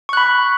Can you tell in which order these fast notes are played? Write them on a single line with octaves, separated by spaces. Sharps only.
C#6 F#6 B5